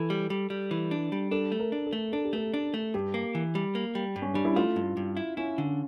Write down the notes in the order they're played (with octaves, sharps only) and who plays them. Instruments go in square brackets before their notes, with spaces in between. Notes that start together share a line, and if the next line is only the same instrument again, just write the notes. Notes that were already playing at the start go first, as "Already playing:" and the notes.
Already playing: [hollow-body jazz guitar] E3 [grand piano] A4
[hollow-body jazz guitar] G3
G3
G3
E3
D4
G3
[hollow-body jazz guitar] D4 [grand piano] A4
[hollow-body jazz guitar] A3
[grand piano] A#4
[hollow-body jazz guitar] D4
[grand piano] A4
[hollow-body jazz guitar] A3
[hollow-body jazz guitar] D4 [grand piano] A4
[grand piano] G4
[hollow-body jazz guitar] A3 [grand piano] A4
[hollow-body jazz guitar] D4
A3
[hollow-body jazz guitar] G2 [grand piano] G4
[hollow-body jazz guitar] A#3
E3
G3
A#3
G3
G2
[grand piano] C#4
[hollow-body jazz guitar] G3 [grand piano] D4
[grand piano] E4
[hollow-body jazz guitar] A3 [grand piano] F4
[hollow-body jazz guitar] G2
G2
E4
[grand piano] C#4 [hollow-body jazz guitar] E4
[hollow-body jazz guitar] D3